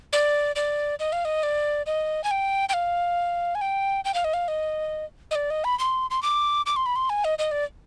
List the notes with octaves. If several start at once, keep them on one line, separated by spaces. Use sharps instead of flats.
D5
D5
D#5
F5
D#5
D5
D#5
G#5
G5
G5
F5
G#5
G5
G5
F5
D#5
F5
D#5
D#5
D5
D#5
B5
C6
C6
D6
D6
C6
B5
C6
G#5
D#5
D#5
D5